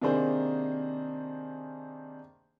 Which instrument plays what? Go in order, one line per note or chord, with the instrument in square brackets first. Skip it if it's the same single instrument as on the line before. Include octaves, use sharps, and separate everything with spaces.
[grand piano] C3 D#3 A#3 D4 G#4 C5